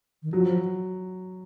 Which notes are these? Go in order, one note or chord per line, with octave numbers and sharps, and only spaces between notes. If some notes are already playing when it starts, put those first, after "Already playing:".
D#3
F3 F#3